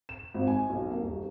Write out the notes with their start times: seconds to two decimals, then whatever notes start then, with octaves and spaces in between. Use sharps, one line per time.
0.09 E7
0.34 G#1
0.47 G#5
0.69 B1
0.91 A#3
1.03 D#1